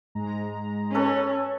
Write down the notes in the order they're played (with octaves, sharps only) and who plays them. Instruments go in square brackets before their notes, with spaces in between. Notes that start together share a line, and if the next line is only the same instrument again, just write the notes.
[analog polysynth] G#2 G#3 A#5
[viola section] C#4 [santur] A4 B4 C#5